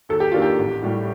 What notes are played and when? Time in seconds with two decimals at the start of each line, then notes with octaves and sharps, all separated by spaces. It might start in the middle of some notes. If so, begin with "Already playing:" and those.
0.09 D#2 A4
0.20 G4
0.32 D#3 A#3 D4 F4
0.42 G4
0.58 A1
0.82 A2 G3